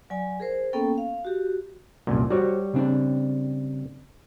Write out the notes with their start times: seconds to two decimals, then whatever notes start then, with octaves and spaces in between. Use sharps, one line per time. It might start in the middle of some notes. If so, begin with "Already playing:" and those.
0.10 F#3 D5 G#5
0.40 G#4 A#4 C5
0.73 A#3 B3 C#4 A4 G5
0.98 F5
1.25 F#4 G4
2.07 C2 F#2 A#2
2.30 G3 F#4 C5 C#5 F#5
2.74 C#3 C4 D4